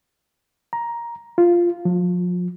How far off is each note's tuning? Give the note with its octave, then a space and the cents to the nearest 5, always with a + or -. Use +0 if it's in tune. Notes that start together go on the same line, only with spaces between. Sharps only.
A#5 +10
F4 -5
F3 +35